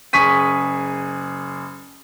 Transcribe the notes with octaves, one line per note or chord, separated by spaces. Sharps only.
F#1 G#4 C#6 B6 D#7